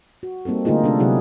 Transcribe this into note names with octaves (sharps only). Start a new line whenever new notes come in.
F#4
G3 A#3 C4 D#4 A4
D3 A3 A#3 D#4 F4 G#4
C3 G#3 A3 B3 D4 A4
C3 F#3 E4 G#4 F#5